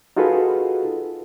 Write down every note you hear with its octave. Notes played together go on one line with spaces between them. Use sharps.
D#4 F4 F#4 G#4 A4 B4